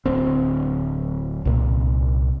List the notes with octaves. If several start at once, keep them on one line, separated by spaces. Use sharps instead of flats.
D1 D2 C4
C2 A#2